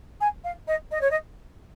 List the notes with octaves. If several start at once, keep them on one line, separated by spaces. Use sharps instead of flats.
G#5
F5
D#5
D#5
C#5
D#5